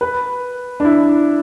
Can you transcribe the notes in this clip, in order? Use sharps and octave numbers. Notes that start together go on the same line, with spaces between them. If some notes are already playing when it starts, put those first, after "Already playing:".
B4
D4
E4